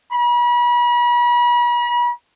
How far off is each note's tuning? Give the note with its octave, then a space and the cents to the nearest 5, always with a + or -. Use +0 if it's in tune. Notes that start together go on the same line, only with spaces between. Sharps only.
B5 -40